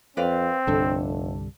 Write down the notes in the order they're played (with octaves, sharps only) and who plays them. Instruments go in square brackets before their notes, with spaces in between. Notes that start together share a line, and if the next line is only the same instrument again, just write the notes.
[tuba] F2 [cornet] C4 [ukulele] B4 D5 F5
[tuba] F1 [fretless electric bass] C2 G2 D3 [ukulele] A4